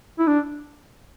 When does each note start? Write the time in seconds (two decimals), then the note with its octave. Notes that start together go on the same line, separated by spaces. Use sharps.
0.19 E4
0.27 D4